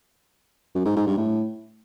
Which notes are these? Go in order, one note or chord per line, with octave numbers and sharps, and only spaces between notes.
F#2
G#2
G#2
G2
A2